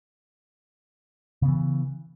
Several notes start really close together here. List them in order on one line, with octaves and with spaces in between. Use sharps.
C#3 B3 E3